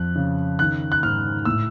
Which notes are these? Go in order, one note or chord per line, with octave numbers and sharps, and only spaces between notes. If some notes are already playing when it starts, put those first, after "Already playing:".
Already playing: F2 F#6
C#3
D#3 F#6
F#6
G#2 F6
A2 E6